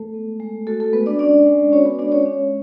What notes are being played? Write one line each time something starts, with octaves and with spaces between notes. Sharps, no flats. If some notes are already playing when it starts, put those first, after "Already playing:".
Already playing: G#3 A3 A4
B3
G#3
A3 F#4 A4
A3 A4
G#3 B3 B4
D4 D5
C#4 D4 D5
G#3
C#4 F#4 C#5
B3 B4
G#3 D4 D5
C#4 C#5
C#4